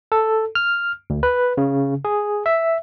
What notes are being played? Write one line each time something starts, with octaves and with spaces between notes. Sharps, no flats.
A4
F6
D2
B4
C#3
G#4
E5